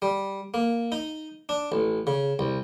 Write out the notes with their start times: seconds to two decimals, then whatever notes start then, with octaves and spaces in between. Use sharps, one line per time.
0.02 G3
0.54 A#3
0.92 D#4
1.49 D4
1.72 A1
2.07 C#3
2.39 C2